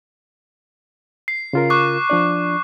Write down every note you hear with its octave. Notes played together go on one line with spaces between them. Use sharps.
C7
C#3 F4 A#4
C#6 D6 F#6
F3 D4 D5